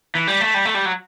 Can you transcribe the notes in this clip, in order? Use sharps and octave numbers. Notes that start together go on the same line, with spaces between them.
E3
G3
A3
G3
A3
G3
F#3